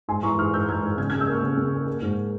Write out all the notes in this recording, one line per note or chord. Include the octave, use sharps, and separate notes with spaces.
G#2 G#5 C6
E3 A#5 C#6
G#2 C#6 F6
G#2 E6 G6
G#2 F6 G#6
G#2
C#3 F6 G#6
C#3 F6 G#6
E6 G6
A#3 C#6 F6
C#3
C#3
A#3
A#3
G#2